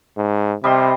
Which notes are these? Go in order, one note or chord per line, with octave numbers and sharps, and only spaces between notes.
G#2
C3 G3 D#5 C6